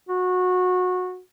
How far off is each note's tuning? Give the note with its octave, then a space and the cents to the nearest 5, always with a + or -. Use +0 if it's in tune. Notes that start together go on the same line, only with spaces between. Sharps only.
F#4 -20